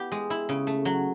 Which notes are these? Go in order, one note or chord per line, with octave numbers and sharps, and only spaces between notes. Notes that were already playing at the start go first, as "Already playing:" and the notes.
Already playing: B3 E4 G4
G#3
E4
C#3
A3
F#3